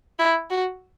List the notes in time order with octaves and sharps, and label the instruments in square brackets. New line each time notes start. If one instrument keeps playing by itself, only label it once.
[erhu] E4
F#4